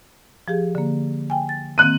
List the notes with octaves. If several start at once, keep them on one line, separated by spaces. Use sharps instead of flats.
F3 G4 G#4
D3 A#3
G5 G#5
A6
D#3 A#3 C4 F#6 D#7